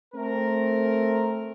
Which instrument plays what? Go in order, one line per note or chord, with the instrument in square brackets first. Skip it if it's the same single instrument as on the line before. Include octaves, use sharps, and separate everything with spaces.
[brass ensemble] A3 C4 A#4